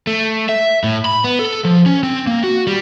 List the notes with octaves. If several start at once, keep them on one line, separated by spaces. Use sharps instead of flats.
A3
E5
A2
B5
B3
A4
F3
C#4
C4
A#3
F#4
G3